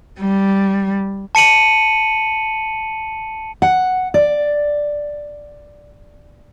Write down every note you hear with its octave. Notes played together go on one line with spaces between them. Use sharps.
G3
A5 C#7 D#7 F#7
F#5
D5